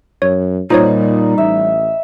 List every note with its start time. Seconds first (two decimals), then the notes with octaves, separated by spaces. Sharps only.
0.22 F#2 C#5
0.70 A#2 G3 D#4 F4 C5 C#5
1.38 A1 E5